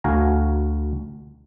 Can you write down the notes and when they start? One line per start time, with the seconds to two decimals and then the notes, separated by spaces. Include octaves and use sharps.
0.04 D2 F#4 F5 G#5 A#5